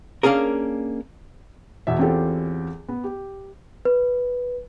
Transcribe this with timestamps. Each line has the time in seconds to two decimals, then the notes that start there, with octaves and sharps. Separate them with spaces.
0.23 A#3 C#4 D4 G#4 A#4
1.87 E2 B2 E5
1.98 E2 C4 C#4 F4 G4 A4
2.88 B3
3.03 G4
3.85 B4